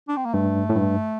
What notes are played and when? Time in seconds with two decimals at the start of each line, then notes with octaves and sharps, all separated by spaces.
0.08 D4
0.17 C4
0.25 A#3
0.34 G2 A3
0.69 A2
0.75 G2